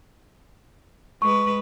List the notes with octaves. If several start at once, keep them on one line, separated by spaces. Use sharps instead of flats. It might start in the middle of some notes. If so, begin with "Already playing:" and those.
G#3 B4 C#6